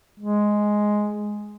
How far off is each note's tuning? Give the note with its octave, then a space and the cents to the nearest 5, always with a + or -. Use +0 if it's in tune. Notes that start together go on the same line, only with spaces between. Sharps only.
G#3 +5